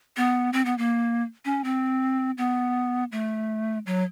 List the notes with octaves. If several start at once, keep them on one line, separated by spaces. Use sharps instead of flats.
B3
C4
B3
A#3
C#4
C4
B3
A3
F#3